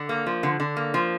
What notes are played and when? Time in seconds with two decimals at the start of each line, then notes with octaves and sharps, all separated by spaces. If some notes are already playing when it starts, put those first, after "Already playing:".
Already playing: D3
0.09 A#3
0.26 F3
0.43 D3
0.60 D3
0.77 A#3
0.94 F3